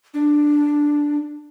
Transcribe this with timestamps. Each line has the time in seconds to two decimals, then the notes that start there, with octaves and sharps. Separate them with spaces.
0.14 D4